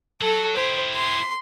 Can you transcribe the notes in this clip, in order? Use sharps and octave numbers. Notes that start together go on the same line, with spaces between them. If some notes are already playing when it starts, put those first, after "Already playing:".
F#3 A4
E4 G4 C5
C6